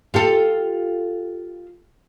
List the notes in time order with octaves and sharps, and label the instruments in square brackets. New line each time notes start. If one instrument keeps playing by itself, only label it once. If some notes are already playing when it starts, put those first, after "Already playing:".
[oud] F4 G4 A4